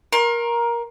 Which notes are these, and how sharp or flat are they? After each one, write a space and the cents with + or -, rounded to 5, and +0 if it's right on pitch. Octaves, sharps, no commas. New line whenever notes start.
A#4 +15 C6 +35